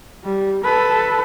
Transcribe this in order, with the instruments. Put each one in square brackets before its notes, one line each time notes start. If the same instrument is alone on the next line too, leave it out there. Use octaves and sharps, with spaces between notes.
[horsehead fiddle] G3
A4 B4